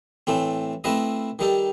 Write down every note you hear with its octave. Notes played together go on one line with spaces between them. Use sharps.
A2 E3 A3 C4
A3 C4 E4 B4 D#5
D#3 G3 D#4 A4